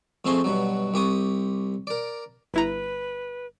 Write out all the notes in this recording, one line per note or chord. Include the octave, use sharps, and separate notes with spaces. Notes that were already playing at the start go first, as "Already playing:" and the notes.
F2 A3 C4 G#4 C6 C#6
G2 B2 F#3
C2 G4 C#6 D#6
A#4 D5
G1 E4 B4 A#5